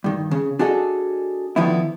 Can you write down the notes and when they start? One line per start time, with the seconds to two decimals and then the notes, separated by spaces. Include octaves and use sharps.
0.04 G2 D#3
0.31 C#3
0.59 D4 F#4 G#4 A4 D#5
1.56 D3 D#3 F3 B3 D#4 E4